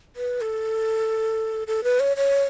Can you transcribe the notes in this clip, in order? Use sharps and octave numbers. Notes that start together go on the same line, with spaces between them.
B4
A4
A4
B4
C#5
C#5